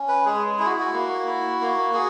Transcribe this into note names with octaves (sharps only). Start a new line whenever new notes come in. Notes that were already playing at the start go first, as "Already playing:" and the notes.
Already playing: C#4
B4
G#3 G#4
E4 G#4
F#4
F#4
A#3
E4
A#3
F#4 G#4